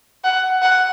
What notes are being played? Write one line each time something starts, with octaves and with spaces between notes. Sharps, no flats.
F#5
F#5